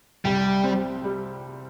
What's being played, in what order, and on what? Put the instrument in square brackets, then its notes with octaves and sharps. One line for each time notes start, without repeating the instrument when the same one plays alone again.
[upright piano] C2 [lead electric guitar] G3
[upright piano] C4
G3